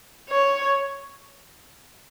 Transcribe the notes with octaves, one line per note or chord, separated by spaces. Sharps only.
C#5